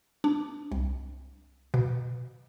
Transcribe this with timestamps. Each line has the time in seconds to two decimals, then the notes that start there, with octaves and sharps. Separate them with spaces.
0.24 D4
0.72 C2
1.74 B2